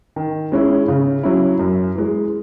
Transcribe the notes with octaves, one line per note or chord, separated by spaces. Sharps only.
D#3
G#3 C#4 E4
C#3
F#3 C#4 E4
F#2
E3 G#3